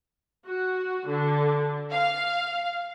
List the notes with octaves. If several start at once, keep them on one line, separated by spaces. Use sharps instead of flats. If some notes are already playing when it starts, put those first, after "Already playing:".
F#4
D3
F5